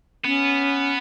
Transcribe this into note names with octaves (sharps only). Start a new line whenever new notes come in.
B3 C#4